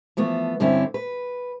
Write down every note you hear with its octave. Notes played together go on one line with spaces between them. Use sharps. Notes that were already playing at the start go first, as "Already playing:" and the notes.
E3 F3 A3 B3
G2 D3 C4 C#4 E4
B4